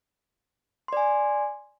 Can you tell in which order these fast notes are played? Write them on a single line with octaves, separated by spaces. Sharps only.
C6 D5 G#5